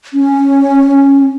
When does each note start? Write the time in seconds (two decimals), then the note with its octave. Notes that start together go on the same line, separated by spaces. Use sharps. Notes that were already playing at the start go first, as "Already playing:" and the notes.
0.14 C#4